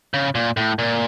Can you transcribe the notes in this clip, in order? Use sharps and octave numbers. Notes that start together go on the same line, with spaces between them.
C#3
A#2
A2
A#2